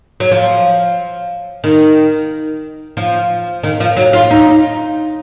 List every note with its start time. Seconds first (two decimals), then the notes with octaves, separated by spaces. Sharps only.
0.20 F#3
0.31 F3
1.64 D#3
2.97 F3
3.63 D#3
3.80 F3
3.97 F#3
4.13 F4
4.31 D#4